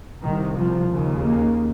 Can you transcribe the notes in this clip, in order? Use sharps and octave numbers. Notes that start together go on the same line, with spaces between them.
C2 C3 D#3
F3
D#2 C#3
A#3